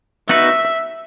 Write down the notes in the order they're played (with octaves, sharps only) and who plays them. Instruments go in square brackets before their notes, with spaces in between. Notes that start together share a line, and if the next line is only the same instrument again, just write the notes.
[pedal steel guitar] B3 D#4 F#4 B4 [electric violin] E5